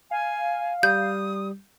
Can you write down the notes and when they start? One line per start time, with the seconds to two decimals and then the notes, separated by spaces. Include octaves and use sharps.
0.11 F5 G#5
0.83 G3 D#6 G6